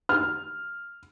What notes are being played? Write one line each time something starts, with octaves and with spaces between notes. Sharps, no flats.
F6